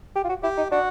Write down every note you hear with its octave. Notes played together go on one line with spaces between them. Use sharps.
G4
F4
F#4
E4 G4
D#4
D4 F#4